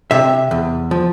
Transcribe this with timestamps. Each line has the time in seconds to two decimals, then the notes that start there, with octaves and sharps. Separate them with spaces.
0.11 C3 E5
0.51 E2
0.91 F3